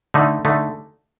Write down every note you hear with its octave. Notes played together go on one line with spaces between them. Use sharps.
D3 A3 D#4
D3 A3 D#4